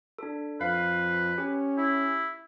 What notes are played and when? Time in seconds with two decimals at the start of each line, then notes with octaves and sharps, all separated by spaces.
0.19 D4 A4
0.61 F2 B4 F5
1.38 C#4 G4
1.78 E4